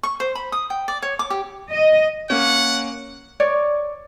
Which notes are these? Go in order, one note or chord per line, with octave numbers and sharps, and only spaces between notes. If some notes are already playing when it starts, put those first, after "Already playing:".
C#6
C5
B5
D#6
G5
D5
C#5
D6
G4
D#5
A#3 C#4 F#5
C#5 D5